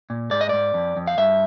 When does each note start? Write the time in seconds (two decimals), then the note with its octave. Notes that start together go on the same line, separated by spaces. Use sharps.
0.10 A#2
0.31 G#2 D5
0.41 D#5
0.49 G#2 D5
0.74 F2
0.96 F2
1.07 F5
1.18 G2 E5